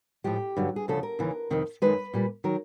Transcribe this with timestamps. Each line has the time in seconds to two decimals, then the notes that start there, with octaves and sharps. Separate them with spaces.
0.24 A2 F3 G#3 G4
0.57 G2 D3 F#3
0.76 G#4
0.88 D2 C#3 F3 A4
1.03 A#4
1.19 D#2 C#3 E3
1.50 F2 C3 D#3
1.82 F#2 D#3 G#3 B4
2.14 A#2 G3
2.44 D#3 F#3 A#4